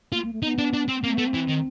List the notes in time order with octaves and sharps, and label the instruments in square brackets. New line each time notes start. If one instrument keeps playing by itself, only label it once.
[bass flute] A#3 [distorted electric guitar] F4
[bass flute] A#3
A3
[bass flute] B3 [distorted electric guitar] D#4
[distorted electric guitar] D4
D4
C4
[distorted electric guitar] A#3 [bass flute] C4
[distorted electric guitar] A3 [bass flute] B3
[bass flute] C4
[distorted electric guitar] E3
D#3